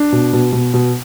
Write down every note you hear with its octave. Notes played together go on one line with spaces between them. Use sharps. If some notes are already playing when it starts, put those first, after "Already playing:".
Already playing: D4
B2
B2
B2
B2